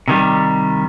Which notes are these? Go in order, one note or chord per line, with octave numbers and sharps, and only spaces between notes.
C3 D#3 G3